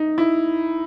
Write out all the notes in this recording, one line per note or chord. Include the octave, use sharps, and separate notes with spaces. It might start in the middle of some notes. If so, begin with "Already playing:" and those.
Already playing: D#4
E4